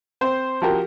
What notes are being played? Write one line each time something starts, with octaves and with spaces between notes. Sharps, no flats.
C4 C5
F3 F#4 G4 A#4